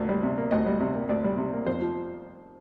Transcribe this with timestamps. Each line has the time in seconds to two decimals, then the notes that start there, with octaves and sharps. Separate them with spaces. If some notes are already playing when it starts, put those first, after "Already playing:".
Already playing: D2 A#3
0.09 G3
0.23 C3
0.38 A#3
0.51 D2 D#5
0.67 G3
0.80 C3
0.95 A#3
1.09 D2 D5
1.24 G3
1.38 C3
1.53 A#3
1.66 F2 C5
1.82 F3